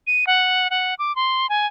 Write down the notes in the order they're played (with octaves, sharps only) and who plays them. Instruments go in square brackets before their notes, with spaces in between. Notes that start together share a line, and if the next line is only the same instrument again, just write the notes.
[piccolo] D#7
F#5
F#5
D6
C6
G#5